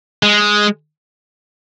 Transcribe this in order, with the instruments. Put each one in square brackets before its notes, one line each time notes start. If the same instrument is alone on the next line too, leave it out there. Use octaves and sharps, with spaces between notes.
[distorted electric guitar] G#3